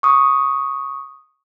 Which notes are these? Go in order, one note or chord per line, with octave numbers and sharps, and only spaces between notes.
C#6 D#6